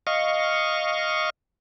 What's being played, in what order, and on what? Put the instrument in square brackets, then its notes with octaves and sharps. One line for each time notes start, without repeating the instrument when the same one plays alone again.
[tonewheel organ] D#5 F5 C#6